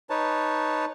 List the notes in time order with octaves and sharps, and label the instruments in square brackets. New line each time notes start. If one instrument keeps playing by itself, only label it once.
[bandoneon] D#4 B4 C#5 A5